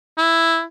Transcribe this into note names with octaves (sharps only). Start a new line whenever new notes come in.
E4